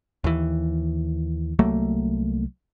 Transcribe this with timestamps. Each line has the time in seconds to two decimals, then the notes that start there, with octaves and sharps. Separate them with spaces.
0.24 D#2 E3
1.59 C2 F#3 A3 A#3